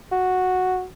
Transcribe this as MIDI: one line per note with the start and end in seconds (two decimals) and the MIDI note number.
0.12 0.85 66